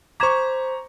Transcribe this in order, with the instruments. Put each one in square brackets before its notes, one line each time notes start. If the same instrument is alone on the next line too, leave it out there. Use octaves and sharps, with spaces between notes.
[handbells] C5 B6 [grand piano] A#5 C#6 [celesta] D6 G#6 E7